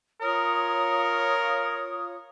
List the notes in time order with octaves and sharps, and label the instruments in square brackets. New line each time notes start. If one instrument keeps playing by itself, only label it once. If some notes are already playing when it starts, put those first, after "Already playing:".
[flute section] F4 C#5 D#6 [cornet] A#4